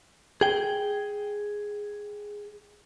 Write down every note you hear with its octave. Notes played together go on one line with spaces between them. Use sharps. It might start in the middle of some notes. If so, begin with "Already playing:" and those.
G#4 G5